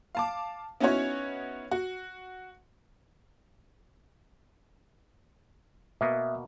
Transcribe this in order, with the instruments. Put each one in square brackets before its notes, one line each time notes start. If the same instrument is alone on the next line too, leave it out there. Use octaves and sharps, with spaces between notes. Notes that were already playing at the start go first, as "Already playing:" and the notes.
[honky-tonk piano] F5 A5 D6
B3 C#4 D#4 E4 F#4 C#5
F#4
[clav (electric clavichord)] B2 A#3 B3 [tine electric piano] E5